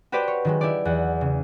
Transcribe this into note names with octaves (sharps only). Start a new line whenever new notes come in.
F#4 G4 B4 C5 D5 G5
C#5
D#3 F#3 G#3
E4 G4 D5
E2 F#5
C#3